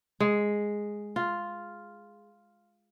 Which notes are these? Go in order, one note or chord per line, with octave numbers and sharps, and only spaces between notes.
G#3
F4